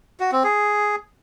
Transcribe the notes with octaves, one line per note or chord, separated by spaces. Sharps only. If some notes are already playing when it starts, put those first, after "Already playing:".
F#4
C4
G#4